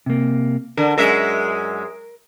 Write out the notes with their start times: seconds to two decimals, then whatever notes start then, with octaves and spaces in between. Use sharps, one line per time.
0.06 C3 A#3
0.77 D3 A#4
0.98 F#2 G#3 A#4 E5